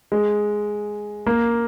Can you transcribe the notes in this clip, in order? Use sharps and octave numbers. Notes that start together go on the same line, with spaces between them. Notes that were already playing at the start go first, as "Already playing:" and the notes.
G#3
A#3